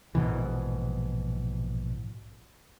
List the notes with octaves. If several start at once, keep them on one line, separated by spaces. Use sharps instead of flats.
A#1 G#2 B2 E3